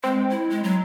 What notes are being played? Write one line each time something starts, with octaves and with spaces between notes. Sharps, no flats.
G#3 C4
E4
G#3
F#3